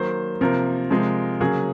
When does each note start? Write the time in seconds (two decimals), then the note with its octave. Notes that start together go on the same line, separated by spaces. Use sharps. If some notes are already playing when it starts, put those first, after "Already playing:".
Already playing: D#3 F#3 A#3 C5
0.41 C3 F3 A#3 A#4
0.90 C3 F3 G#3
1.41 C#3 F#3 A#3 G#4